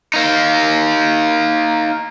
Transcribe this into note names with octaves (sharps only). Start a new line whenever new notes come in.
A#3 D#4